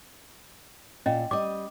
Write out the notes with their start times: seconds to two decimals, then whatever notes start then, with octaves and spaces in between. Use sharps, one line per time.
1.06 A#2 C#4 D#5
1.31 G3 D#5 D6